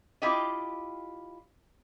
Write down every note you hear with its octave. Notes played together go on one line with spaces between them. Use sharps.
E4 F4 G4 D5 D#5